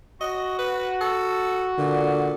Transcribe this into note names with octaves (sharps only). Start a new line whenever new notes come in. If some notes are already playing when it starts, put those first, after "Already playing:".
F#4 D#5
B4
A4
A#2 D3